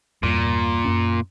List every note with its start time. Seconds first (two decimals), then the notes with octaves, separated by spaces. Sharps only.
0.23 E2 G2 A#2 G3
0.85 F#2 C#4